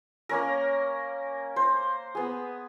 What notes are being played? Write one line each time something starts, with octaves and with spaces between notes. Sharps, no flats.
A#3 C#4 A#4
C5
B3 G#4